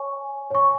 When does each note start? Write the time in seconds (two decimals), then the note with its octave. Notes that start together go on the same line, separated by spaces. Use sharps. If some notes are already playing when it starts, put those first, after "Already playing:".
Already playing: C#5 G#5 C#6
0.50 C#5 G#5 C#6